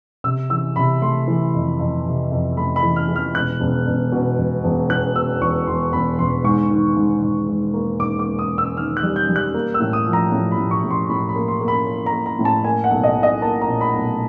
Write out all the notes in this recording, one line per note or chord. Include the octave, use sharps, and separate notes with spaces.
C3 E6
E3 E6
C3 B5
A3 C6
E3
F2
F2
C3
F2
A3 B5
B5
E3
F6
E3
F6
E1 F#6
E1
E1
B2
E1
E1
E2 F#6
B2 E6
E2 C#6
E2 C6
E1 B5
E1 C6
G#2 C#6
D#3
G#2
G#2
G#2
A#3
G#2 D6
D6
A#3
D#6
A#3
E6
D#3 F6
F#6
G3
G6
G3
F#6
A#3
E6
A2
D#6
F3
A#5
A2
B5
A2
C#6
A2
C6
A2 B5
B5
A#3
C6
A#3
B5
A#3
A#5
A#3
A#5
A2
A5
A#3 G#5
F#5
B1
D#5
B1
D#5
A#3 A5
A#5
A#2
B5
B1